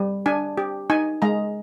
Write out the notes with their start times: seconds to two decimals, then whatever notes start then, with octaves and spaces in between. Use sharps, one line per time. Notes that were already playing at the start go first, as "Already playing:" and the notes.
Already playing: G3
0.26 D4 G#5
0.58 G4
0.90 D#4 G#5
1.22 G#3 A#5